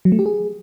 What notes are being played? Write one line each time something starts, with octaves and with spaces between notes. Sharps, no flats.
F#3
A3
G4
G#4